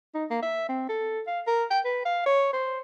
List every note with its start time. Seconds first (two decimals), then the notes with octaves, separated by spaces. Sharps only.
0.15 D#4
0.31 A#3
0.42 E5
0.69 C4
0.89 A4
1.27 F5
1.47 A#4
1.71 G5
1.85 B4
2.05 F5
2.26 C#5
2.53 C5